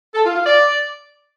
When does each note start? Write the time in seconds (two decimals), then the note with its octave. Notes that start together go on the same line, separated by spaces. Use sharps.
0.15 A4
0.25 F4
0.36 F4
0.46 D5